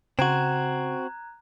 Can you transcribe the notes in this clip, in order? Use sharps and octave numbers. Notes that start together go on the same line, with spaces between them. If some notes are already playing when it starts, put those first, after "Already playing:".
C#3 C4 F#4 A#5 F#6 G#6